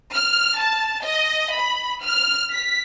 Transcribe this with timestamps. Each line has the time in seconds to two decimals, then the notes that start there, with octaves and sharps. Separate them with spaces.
0.13 F6
0.61 A5
1.04 D#5
1.55 B5
2.04 F6
2.52 B6